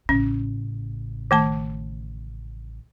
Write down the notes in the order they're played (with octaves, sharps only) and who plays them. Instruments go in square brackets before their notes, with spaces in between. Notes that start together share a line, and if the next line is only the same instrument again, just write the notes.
[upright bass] A1 C#3 [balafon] C#4
[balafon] D#3 A3 A5